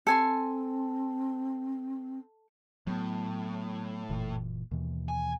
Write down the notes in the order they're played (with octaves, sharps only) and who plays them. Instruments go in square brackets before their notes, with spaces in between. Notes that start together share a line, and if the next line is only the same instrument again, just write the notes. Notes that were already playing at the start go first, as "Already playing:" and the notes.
[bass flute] C4 [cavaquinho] A4 G#5 C6
[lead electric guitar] A2 [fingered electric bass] F#3 B3
[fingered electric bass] F#1 A#2 E3
D#2 B2 E3
[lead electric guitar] G#5